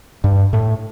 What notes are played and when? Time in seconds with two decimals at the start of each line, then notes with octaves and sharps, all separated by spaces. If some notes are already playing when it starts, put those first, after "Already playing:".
0.24 G2
0.53 A2